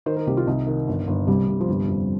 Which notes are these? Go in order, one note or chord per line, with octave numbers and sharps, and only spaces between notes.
D#3 C5
A#4
C2 G4
F4
C2 D#4
D#3
G1
G1
C2 G3
C2
F3
G1 G3
F2